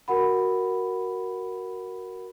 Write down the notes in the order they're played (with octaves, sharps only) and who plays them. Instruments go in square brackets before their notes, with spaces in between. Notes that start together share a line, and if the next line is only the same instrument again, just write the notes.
[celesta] F#4 A#4 F#5 B5